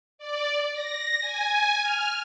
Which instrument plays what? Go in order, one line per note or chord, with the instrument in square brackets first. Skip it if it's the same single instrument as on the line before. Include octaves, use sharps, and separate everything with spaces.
[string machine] D5
A#6
G#5
F6